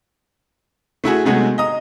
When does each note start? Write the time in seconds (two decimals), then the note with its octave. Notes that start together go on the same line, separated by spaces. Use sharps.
1.04 A3 E4 F#4 G#4
1.25 C3 F#3 G#3 A3 B3 G#4
1.58 D#5 A#5 D#6